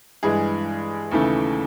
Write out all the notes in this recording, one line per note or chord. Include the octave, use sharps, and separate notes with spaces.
G2 E3 G#3 G#4
D#2 C#3 E3 A3